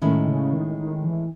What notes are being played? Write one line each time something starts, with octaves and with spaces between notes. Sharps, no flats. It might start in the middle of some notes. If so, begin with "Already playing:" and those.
A2 D#3 G#3 C#4 E4
C#3
D#3
D#3
E3